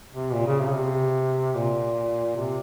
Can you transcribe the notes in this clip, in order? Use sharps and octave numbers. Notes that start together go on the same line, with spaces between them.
C3
A#2
C#3
C3
C#3
C3
A#2
C3